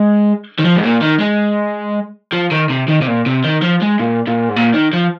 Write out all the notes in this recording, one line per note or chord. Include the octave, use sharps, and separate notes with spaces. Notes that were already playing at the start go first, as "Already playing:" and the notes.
Already playing: G#3
D#3
F3
G#2
A#2
D#3
G#3
F3
D#3
C3
D#3
C3
A#2
C3
D#3
F3
G#3
A#2
A#2
G#2
A#2
D#3
F3